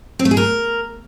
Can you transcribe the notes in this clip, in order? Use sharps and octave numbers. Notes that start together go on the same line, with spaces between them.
C4
A3
G#4
A#4